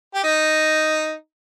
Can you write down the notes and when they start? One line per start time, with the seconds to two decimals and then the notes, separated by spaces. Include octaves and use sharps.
0.14 G4
0.24 D#4